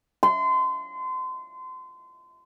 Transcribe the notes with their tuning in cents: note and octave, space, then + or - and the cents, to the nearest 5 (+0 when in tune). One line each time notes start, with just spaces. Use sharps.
C6 -30